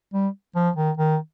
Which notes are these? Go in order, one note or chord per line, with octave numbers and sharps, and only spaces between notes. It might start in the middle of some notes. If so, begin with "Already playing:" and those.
G3
F3
D#3
D#3